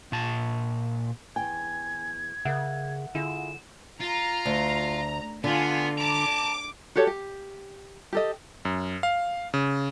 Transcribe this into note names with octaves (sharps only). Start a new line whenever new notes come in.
A#2 A5
E2 G2 G5 G#5 G#6
C#3 A#4 D5 E5 F#5
D3 E4 F4 G#4 E7
F4 A#5
D2
D3 B3 F4 G#5
A5 A#5 D6
F#4 G4 A4 C#5
G4
G4 A4 D#5
F#2
F5
C#3